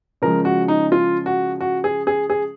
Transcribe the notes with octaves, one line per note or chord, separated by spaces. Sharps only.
C#3 F3 G#3 A#4
F#4
D#4
F4
F#4
F#4
G#4
G#4
G#4